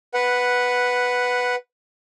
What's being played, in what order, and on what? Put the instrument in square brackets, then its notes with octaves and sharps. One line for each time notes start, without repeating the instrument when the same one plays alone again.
[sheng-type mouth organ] B4 F#5